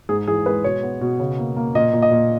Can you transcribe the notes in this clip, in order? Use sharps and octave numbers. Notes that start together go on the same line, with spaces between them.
G#2 G#4
E3 G#4
G#3 B4
B2 C#5
B3
B2
C#3
A#3
A#3
A#2 D#5
A#2
D#5
A#2